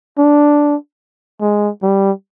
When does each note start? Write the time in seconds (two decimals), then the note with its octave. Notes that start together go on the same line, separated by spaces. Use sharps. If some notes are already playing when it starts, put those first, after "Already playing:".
0.18 D4
1.41 G#3
1.83 G3